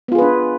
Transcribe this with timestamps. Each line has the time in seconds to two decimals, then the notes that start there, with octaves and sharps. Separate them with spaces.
0.08 B3
0.12 F4
0.15 G#4
0.18 B4
0.22 D4